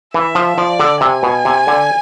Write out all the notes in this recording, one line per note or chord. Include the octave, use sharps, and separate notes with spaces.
E3 E5
F3
F3 D5
D3
C3 G#5
B2
C3
D3